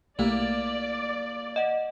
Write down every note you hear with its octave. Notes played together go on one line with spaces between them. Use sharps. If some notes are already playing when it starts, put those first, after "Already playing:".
B1 A3 A#3 E4 G4 D5
D#5 F#5